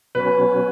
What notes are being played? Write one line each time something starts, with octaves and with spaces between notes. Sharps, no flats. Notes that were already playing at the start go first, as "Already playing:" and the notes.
B2 F#3 C#4 B4